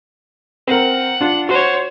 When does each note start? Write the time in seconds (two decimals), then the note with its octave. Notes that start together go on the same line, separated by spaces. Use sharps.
0.67 C4 A#4 F#5
1.21 D4 F4
1.49 F#4 C5 C#5